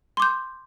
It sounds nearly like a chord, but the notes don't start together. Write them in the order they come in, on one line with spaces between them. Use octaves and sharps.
C6 D6 G6